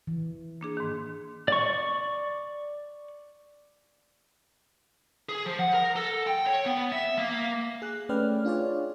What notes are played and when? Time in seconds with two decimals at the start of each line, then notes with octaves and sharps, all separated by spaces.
0.07 E3
0.61 A#3 D4 G#4
0.77 G#2 D#3
1.48 D5 C#6
5.29 G#4
5.46 F3
5.59 F#5
5.74 A#4
5.96 A4
6.27 G5
6.47 C#5
6.66 B3
6.92 E5
7.18 A#3
7.82 G#4 F#6
8.09 A3 C#4 B4 D5 G5 F6
8.45 D4 F4 G#4 C#5 D5